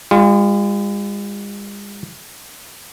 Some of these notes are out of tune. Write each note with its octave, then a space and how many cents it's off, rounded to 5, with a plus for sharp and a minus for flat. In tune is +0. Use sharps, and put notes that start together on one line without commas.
G#3 -45 F4 +0